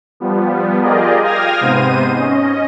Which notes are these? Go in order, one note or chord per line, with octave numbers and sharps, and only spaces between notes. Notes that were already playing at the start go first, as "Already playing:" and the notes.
F3 G3 B3
F4 G4 G#4 A#4 D5 D#5
F5 G5 D#6 F6 G#6 A#6
G#2 C3 B3 C5 D#7
C#4 D#5